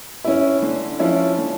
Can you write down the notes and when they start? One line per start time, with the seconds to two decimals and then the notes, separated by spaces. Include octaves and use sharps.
0.24 C#4 E4
0.62 D3
0.99 F3 C#4 E4
1.38 D3